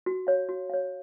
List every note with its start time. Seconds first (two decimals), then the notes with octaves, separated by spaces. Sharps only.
0.06 F#4
0.27 C#5 F5
0.49 F#4
0.70 C#5 F5